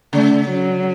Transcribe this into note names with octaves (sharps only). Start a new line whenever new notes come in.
C#3 A3
F#3